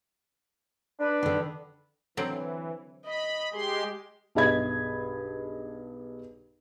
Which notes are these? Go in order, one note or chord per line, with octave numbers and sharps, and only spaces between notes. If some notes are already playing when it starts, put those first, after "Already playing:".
D4 B4
D3 D#3
D3 E3 F#3 C4
D#5 B5
G#3 G4 G#4 C6
B1 G2 G#4 D#5 B5 G#6